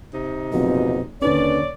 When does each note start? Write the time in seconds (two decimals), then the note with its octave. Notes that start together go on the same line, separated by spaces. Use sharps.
0.13 C3 D#4
0.52 F#1 B2 F3 F#3 C4
1.21 D#2 D3 C#4 B4 C#5 D5